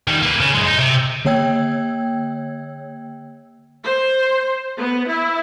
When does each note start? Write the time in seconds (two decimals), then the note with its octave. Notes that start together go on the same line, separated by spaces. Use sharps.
0.08 D#3 G3
0.23 A#3 B4
0.40 C#3
0.54 F#2 G#3
0.67 D#4
0.79 C3
1.25 D3 A#3 C#5 G5 E6 G#6
3.83 C5
4.78 B3
5.08 E4